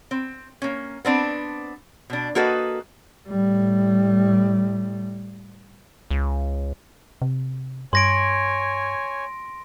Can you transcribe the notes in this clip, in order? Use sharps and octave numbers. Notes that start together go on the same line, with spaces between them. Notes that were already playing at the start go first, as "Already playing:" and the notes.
C4
A#3 C#4
B3 C4 D4
B2 D4
A#3 F#4 A4 B4 D#5
A2 G3
C#2
C3
G2 C#5 G#5 C6 A#6 D7